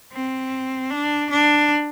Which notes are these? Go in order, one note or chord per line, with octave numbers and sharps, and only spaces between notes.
C4
D4
D4